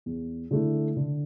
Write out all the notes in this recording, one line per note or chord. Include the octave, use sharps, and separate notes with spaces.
E2
D3 A3 E4
D3